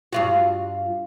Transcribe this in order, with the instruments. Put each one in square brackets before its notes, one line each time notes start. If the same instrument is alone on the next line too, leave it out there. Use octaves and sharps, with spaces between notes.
[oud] G2 F4 F#4